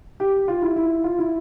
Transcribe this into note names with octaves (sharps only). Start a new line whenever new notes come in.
G4
F4
E4
E4
F4
E4